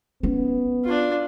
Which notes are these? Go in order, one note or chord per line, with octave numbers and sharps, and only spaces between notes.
B3 C#4
D4 F4